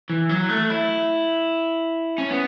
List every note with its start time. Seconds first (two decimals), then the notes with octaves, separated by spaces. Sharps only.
0.10 E3
0.29 F#3
0.49 A3
0.70 E4
2.18 C#4
2.31 B3